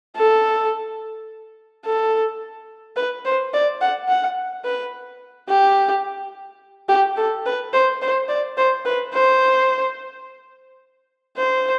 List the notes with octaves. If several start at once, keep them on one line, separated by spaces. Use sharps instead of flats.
A4
A4
B4
C5
D5
F#5
F#5
B4
G4
G4
A4
B4
C5
C5
D5
C5
B4
C5
C5